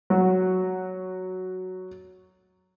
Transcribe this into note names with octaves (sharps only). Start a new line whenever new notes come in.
F#3 F#4